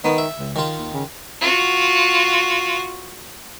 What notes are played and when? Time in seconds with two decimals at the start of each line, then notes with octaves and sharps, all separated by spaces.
0.04 D#3 B3
0.18 E5
0.38 C#2
0.56 D#3 F4
0.77 D#2
0.93 C#3
1.41 F4 F#4